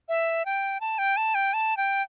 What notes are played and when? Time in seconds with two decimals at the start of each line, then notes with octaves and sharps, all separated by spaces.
0.09 E5
0.46 G5
0.81 A5
0.98 G5
1.17 A5
1.35 G5
1.54 A5
1.77 G5